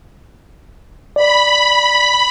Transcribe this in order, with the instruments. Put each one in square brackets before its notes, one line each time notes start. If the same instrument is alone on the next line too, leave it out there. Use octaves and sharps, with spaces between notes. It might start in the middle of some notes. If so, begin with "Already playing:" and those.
[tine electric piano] D5 [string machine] B5